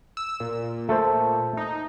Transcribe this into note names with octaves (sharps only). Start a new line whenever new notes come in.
E6
A#2
A3 A4 C5
D#4